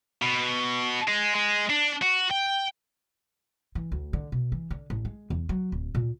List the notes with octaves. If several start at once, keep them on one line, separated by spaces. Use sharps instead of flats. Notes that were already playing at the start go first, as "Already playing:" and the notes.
B2
G#3
G#3
D4
F#4
G5
E3
D2
D3
B2
E3
D3
A1
G#3
E2
F#3
D1
A#2